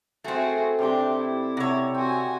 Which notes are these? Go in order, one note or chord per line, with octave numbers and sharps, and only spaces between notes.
A3 C4 F#4 G#4
C3 D4 G4 D5 C6
E4
C3 F#4 A4 C#5
C4 F#4 G#5